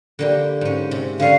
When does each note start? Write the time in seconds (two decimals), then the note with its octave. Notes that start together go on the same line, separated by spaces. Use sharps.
0.19 D3 A#3 G4
0.61 G#2 C#4
0.91 C3
1.20 D3 C#4 F5